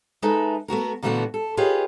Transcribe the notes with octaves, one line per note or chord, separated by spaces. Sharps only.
G#3 D#4 A4 B4 E5
A3 B3 F#4 A#4
A#2 D3 E3 A3 B3 F#4
A4
F4 G4 G#4 B4 C#5 D#5